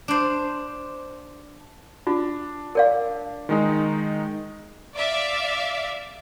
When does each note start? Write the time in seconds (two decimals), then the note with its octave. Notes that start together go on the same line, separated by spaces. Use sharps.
0.08 D4 C5
2.07 D4 F4
2.75 A#4 D5 F5
3.49 D#3 G#3 D#4
4.95 D5 E5 F5